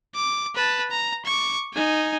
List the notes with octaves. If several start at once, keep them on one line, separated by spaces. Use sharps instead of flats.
D6
B4 A5
A#5
C#6 D6
D#4 G#5